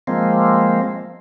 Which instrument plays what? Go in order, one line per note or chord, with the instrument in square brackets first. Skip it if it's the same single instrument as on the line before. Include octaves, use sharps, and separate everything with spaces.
[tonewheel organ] F3 G#3 A#3 C4